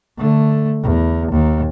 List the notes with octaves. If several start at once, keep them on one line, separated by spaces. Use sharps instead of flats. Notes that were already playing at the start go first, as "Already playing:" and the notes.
D3 A3
E2
D#2